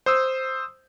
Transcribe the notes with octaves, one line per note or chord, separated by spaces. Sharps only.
C5 D#6 E6